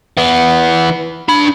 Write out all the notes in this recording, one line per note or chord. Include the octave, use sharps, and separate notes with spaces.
E3 B3
D4 B5